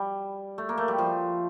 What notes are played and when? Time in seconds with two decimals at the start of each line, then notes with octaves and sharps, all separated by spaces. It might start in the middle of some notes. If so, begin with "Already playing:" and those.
Already playing: G3
0.58 A3
0.69 A#3
0.78 A3
0.88 G3
0.98 F3